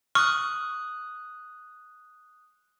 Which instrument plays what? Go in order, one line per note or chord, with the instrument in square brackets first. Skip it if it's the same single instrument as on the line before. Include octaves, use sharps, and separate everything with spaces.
[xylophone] C#6 [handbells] D#6 F#6 [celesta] F6